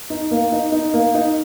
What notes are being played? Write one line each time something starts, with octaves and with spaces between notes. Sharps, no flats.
D#4
A#3
D#4
D#4
A#3
D#4